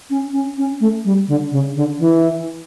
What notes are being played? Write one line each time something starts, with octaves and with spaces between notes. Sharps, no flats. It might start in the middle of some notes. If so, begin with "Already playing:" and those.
C#4
C#4
C#4
A3
G3
D3
C#3
D3
E3